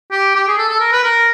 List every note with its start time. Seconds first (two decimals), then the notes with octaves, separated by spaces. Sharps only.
0.11 G4
0.35 G4
0.47 G#4
0.58 A4
0.68 A4
0.80 A#4
0.92 B4
1.04 A#4